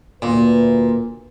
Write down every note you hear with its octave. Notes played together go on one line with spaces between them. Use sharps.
D2 A#2 B4